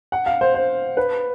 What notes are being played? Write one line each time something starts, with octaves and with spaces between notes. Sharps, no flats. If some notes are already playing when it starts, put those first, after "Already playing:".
F#5
F5
C5
C5
B4